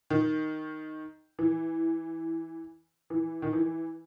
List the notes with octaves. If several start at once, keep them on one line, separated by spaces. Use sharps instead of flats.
D#3
E3
E3
D#3
E3